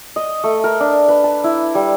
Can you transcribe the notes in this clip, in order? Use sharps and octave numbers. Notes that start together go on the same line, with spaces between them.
D#5
A3
A#4
D4
B4
A5
E4
G3